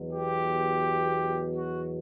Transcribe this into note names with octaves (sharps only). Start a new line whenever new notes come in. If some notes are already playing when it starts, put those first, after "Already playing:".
Already playing: E2 B2 F#3
G4
F#4